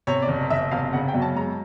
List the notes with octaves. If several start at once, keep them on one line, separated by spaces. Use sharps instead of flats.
C3 C#5
D5
F#1
F#1 E5
C3 F5
C#3 F#5
G5
F#2
A5
G#3 A#5